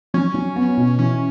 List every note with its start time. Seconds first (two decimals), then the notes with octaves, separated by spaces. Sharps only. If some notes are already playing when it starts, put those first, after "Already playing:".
0.14 F#3 C#4
0.34 F#3
0.56 B3
0.77 B2
0.98 E3 C#4